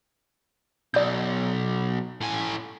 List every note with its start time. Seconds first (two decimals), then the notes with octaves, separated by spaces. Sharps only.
0.94 B1 D5 G6
2.21 A2 G#5